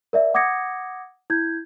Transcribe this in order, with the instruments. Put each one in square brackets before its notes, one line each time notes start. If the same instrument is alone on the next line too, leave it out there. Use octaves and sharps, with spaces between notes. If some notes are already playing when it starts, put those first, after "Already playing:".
[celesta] A#4 D5 E5
F#5 D6 D#6 G#6 A#6 C#7
E4 G6 G#6